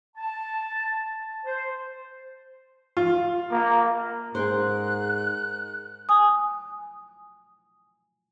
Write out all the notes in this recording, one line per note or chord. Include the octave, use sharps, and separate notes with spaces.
A5
C5
F4
A#3
G#2 G#4 A#4 C5 F#6
G#5 D#6